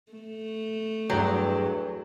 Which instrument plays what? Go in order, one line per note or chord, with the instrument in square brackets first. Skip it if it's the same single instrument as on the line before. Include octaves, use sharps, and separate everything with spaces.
[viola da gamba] A3
[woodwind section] E2 [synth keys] G2 G5 [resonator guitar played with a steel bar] F#3